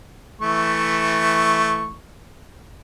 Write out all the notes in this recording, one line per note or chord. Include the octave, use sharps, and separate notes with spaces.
E3 A3 C#6